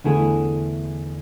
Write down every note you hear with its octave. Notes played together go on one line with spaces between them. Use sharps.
E2 D3 A3 E4 G#4